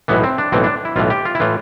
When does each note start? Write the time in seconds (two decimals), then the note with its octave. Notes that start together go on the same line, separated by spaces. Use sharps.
0.08 B1 A2 E3 B3
0.24 C4
0.38 D4
0.52 B1 A2 E3 C4
0.64 D4
0.85 E4
0.96 B1 A2 E3 F4
1.10 G4
1.25 F4
1.35 E4
1.40 A2 E3 F4